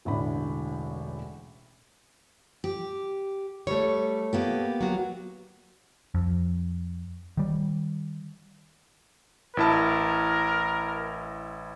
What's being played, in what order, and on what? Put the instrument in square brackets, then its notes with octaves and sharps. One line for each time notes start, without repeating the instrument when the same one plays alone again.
[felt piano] E1 A1 A2 D3 B5
[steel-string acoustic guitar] G4
[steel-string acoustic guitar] G3 [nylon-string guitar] A3 C#5
[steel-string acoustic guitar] A#3 B3 G4
[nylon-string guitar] F#3 F#4
[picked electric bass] F2
D#3 G3
[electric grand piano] A1 E4 A5 [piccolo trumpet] A#4